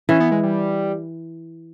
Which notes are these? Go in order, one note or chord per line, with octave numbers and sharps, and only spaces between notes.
E3 C#4
B3
G#3
G3